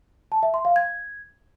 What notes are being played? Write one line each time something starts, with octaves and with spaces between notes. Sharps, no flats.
A5
E5
C6
F5
G#6